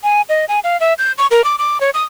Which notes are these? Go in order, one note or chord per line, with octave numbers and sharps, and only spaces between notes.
G#5
D#5
G#5
F5
E5
G6
C#6
A#4
D6
D6
C#5
D#6